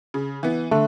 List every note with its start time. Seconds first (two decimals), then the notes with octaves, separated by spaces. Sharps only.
0.14 C#3
0.43 E3 B3
0.71 D3 A3